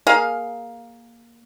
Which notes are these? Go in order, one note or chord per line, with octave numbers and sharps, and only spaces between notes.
A#3 G#4 F5